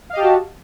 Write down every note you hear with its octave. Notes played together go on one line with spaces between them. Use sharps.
F#4 G4 D#5 F5 A5